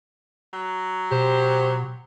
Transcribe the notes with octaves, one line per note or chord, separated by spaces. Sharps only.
F#3
B2 G4 C5